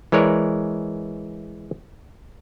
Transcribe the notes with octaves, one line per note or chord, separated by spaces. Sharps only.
E3 G#3 A#4 C#5 D5